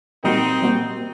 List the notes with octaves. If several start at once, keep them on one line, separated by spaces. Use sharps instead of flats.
A#2 G3 A#3 C4 D#4 F#4
A#2 G3 A#3 F#4